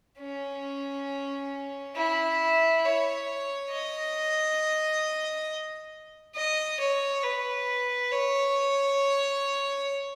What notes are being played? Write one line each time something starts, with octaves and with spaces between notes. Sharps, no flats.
C#4
E4
C#5
D#5
D#5
C#5
B4
C#5